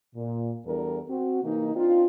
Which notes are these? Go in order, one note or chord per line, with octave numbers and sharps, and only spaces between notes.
A#2
E2 E3 G3 D4 A4 A#4
C4 F#4
C3 E3 A#3 D#4
C4 D4 D#4 F4